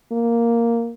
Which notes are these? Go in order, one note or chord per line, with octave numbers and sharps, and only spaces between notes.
A#3